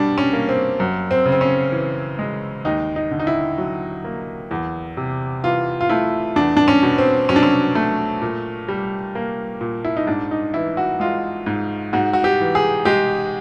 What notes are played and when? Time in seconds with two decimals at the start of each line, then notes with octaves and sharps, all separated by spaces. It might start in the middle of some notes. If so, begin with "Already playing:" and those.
Already playing: B2 G3 D4
0.18 C#4
0.33 A#3
0.49 C4
0.80 F#2
1.11 C4
1.25 C#3
1.32 C4
1.41 C#4
1.72 E3
2.19 G#3
2.65 D#2 D#4
2.96 D#4
3.11 D3
3.20 D#4
3.27 E4
3.58 F#3
4.04 A#3
4.51 E2
4.97 C3
5.43 E3 F4
5.81 F4
5.90 A3 E4
6.36 E2 D4
6.57 D4
6.68 C#4
6.83 B2
6.98 C4
7.29 F#3 C#4
7.36 D4
7.43 C#4
7.75 A3
8.22 A#2
8.68 G3
9.15 A#3
9.61 A#2
9.84 E4
9.96 D#4
10.07 G#2 D4
10.31 D#4
10.54 E3 E4
10.77 F#4
11.00 G#3 F4
11.46 G#2
11.93 G#2 F#4
12.13 F#4
12.24 G4
12.40 E3
12.55 G#4
12.85 G#3 G4